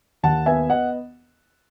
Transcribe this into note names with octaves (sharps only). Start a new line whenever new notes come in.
D#2 F#5 A5
B3 E5 G#5
D#5 F#5